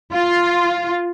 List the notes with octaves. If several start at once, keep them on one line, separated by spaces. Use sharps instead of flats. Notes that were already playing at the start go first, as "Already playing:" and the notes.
F4